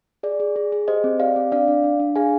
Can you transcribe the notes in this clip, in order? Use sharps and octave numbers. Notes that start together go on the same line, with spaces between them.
G#4 D5
G#4
G#4
G#4
G4 C5 D#5
C4
G4 D5 F5
C4
D4 D5 F5
D4
D4
D4
G#4 F5 G#5